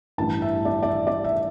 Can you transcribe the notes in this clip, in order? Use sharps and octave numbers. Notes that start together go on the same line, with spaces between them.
A1 G2 E3 A5
E5
D5
D5
E5
D5
E5